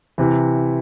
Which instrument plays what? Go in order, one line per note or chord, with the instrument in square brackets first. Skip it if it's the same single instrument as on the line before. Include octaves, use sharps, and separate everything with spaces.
[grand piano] C3 E3